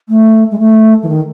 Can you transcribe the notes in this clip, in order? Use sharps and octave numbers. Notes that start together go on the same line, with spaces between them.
A3
G#3
A3
E3
D#3